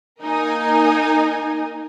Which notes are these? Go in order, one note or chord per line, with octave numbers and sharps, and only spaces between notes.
A#3 D#4 A#4 D#5 G#5